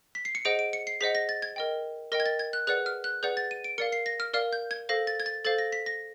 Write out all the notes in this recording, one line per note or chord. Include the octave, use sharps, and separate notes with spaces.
B6
C7
C#7
G#4 C5 D#5 F#5 D7
D7
C#7
C7
G#4 C5 D#5 F#5 B6
A#6
A6
G#6
A#4 D#5 G5
A#4 D#5 G5 A#6
G#6
A6
G#6
F#6
G#4 B4 D5 F#5 F#6
F6
F#6
G#4 B4 D5 F#5 G6
A6
D#7
D7
A#4 D5 F5 C#7
C7
A#6
F6
A#4 D5 F5 F6
G6
G#6
A4 C5 F5 A#6
A6
G#6
A6
A4 C5 F5 A6
A#6
B6
A#6